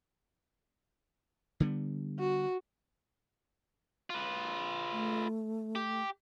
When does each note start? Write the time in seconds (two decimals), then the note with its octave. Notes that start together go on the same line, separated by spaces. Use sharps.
1.60 D3 G3 B3
2.20 F#4
4.10 F4 B4
4.91 A3
5.75 G4